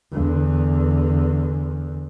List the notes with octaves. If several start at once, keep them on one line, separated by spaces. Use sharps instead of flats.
E2 D3